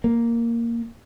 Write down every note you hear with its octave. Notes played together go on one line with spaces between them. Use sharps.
A#3